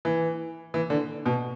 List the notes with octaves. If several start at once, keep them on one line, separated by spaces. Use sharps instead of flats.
E3
E3
D3
B2